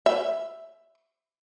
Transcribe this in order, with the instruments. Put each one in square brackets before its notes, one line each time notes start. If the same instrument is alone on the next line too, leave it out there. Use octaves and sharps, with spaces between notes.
[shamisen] E5